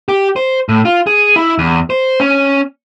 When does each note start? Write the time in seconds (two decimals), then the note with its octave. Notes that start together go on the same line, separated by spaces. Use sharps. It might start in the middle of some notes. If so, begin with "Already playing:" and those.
0.09 G4
0.36 C5
0.69 A2
0.85 F4
1.07 G#4
1.36 E4
1.58 E2
1.90 C5
2.20 C#4